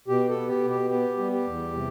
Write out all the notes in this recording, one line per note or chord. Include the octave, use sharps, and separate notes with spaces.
B2 G4
A4
B3
G4
B2
G4
B3 G4
G3
G4
E2
C3